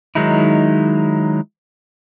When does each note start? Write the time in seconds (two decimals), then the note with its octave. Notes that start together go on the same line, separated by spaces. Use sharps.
0.15 D#3 F#3 G#3 D#4 E4